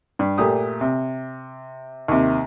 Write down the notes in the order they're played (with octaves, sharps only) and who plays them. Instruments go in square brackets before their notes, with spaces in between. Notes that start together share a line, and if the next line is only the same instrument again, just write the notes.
[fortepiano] G2
A#2 A3 G4 D#6
C3
D#2 C3